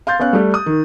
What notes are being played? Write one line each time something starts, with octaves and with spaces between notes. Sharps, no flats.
F5 C6 G6 A6
B3 C#4 F5 F#6
G3 A3 G4
D#6
D#3